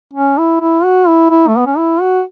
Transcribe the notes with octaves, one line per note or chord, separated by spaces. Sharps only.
C#4
E4
E4
F#4
E4
E4
A3
B3
C#4
E4
F#4